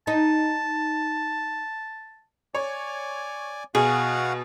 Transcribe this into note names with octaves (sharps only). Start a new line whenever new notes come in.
D#4 A5
C#5 D5 G#5
B2 F#4 G#4 F5 F#5